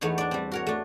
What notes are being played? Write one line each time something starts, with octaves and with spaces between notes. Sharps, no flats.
E2 A3 B3 D#4 C#5
D4 D5
G3 C4
F#4 A#4 C#5
A3 D4